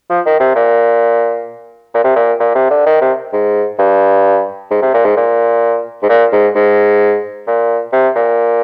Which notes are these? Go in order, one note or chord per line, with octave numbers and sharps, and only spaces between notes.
F3
D#3
C3
A#2
A#2
C3
A#2
A#2
C3
D3
D#3
C3
G#2
G2
G#2
C3
A#2
G#2
A#2
G#2
A#2
G#2
G#2
A#2
C3
A#2